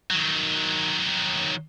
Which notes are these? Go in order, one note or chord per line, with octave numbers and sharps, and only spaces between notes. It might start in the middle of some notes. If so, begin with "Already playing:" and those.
D#3 F#3